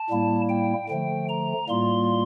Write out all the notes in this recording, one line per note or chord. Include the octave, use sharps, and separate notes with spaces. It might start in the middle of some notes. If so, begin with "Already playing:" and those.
Already playing: A5
A2 G3 A#3 E4
G5
D3 F3 A3 G5
A#5
A2 G3 A#3 F4 C6